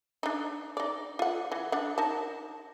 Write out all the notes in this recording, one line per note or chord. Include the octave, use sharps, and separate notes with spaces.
D4 D#4
D#4 D5
F4 F#5
E3
D4 F#5
D#4 A#4 A5